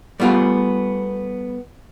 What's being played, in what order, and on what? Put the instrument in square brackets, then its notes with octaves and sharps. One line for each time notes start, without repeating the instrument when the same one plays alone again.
[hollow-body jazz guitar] G3 A3 B3 F4 G#4